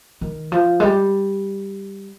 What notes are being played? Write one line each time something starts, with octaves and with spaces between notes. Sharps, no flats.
D#3
F3
G#3
G3